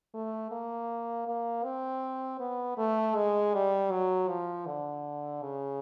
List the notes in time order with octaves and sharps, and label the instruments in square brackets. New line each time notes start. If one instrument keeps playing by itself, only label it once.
[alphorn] A3
A#3
A#3
C4
B3
A3
G#3
G3
F#3
F3
D3
C#3